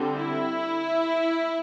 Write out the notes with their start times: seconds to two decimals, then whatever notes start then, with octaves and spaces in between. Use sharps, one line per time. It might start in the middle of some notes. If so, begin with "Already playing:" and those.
Already playing: D3 G3 C4
0.16 E4